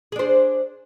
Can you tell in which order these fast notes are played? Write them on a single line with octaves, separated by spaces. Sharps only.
G#4 D4 C5